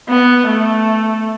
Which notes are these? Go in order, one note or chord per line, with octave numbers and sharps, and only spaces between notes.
B3
A3